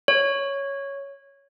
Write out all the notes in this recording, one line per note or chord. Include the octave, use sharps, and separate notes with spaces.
C#5